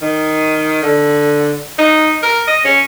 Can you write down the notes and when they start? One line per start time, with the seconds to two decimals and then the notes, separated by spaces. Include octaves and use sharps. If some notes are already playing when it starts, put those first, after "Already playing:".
0.02 D#3
0.83 D3
1.78 D#4
2.23 A#4
2.47 D#5
2.65 C#4